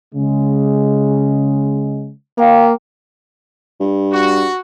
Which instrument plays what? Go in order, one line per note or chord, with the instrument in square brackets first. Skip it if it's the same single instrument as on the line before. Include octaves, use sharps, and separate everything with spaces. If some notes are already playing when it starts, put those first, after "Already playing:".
[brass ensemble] C#3 G#3
[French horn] A#3 [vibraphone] F5 G5
[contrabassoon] G2
[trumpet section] F#4